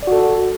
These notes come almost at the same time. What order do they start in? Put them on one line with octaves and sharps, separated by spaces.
D5 F#4 A4